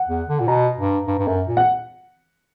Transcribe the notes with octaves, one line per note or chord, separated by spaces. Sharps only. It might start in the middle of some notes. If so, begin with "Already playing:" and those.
Already playing: F#5
E2
D3
A#2
B2 A#5
G2
G2
G2
F#2
A#2
F#5